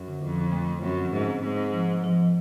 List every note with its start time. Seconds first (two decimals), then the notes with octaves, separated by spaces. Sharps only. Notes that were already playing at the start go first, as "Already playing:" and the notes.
Already playing: F#2
0.08 D3
0.22 F2 D3
0.37 D3
0.52 A3
0.67 A3
0.82 F#2 C4
0.98 F3
1.13 G#2 A3
1.28 C4
1.43 G#2 C4
1.58 C4
1.74 F3
1.88 F3
2.04 F3
2.19 F3